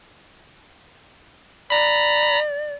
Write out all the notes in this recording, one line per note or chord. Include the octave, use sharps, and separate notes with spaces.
D5 A#5 B5